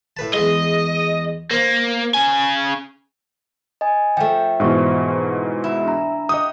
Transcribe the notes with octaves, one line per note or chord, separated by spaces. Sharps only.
A2 B4 A5
E2 G#3 D#5
A#3 A#4 C5
C#3 G#5
D#5 G#5
F3 A3 G5
G#2 B2 E3 C5 C#6
E4
D4 A#5
G4 D#5 F#5 D#6